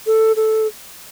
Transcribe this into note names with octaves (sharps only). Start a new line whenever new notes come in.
A4
A4